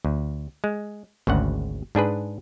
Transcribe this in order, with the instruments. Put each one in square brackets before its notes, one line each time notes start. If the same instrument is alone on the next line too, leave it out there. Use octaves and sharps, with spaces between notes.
[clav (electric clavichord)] D2
G#3
G#1 D2 C#3 F#5
G#2 D4 G#4 B4